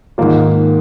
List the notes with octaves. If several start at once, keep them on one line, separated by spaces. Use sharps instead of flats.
G#2 D#3 A#3 F4